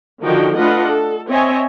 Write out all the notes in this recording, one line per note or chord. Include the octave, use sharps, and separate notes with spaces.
D3 D#3 F3 D#4 F#4 G5
A3 D4 F4 B4 D#5 F#5
A4
C4 C#5 D#5 E5 G#5